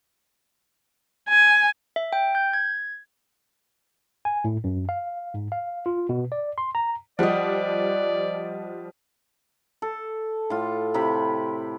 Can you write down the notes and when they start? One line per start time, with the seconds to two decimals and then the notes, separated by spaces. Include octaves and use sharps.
1.29 G#5
1.96 E5
2.13 G5
2.35 G6
2.53 G#6
4.25 G#5
4.44 A2
4.64 F#2
4.89 F5
5.34 G#2
5.52 F5
5.86 F4
6.09 B2
6.32 D5
6.58 C6
6.75 A#5
7.19 F3 G3 D5 D#5 F#5
9.82 A4
10.50 A2 F4
10.94 C3 E4 G4 B5